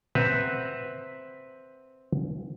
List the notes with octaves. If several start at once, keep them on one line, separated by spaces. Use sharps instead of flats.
C4 B4 E5 F#5 A#5